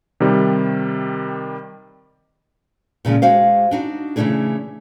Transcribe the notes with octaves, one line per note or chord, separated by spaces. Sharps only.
C3 D#3 G3
A#2 C#3 F3 G#3
G#3 F#4 C5 F5
D4 D#4 F#4
C#3 E3 F3 A3 D4 G#4